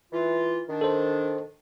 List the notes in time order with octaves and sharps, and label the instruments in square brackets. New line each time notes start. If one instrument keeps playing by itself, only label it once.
[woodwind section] E3 F4
D#3 D4
[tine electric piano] A4 C5